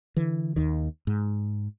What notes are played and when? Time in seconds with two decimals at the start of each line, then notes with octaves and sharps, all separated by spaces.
0.17 D3 E3
0.56 D#2 D#3
1.07 G#2